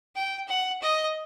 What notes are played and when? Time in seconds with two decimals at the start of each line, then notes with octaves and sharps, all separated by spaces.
0.15 G5
0.48 F#5
0.82 D#5